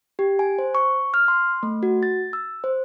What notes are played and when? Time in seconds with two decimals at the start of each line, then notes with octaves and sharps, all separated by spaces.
0.19 G4
0.39 G#5
0.59 C5
0.75 C#6
1.14 F6
1.28 C6
1.63 A3
1.83 F#4
2.03 A6
2.33 E6
2.64 C5